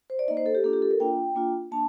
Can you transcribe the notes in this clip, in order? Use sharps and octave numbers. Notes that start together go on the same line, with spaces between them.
C5
D5
A#3 D#4 D#5
C5
A4
G4
A#3 D4 F4 A4
G4
A4
A#4
A#3 D4 F4 G5
A#3 D4 F4
A#3 D4 A5